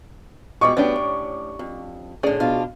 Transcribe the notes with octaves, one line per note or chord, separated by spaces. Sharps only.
B2 G3 G#3 C#6 D6
D2 G2 B3 C#4 D4 G4
A2
F2
A2 D3 C#4 G#4 D5
B2 D4 F4 F5